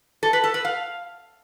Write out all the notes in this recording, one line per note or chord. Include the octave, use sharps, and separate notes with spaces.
A4
B4
A4
B4
F5